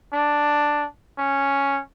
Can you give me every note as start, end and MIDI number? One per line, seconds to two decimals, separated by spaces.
0.13 0.85 62
1.18 1.80 61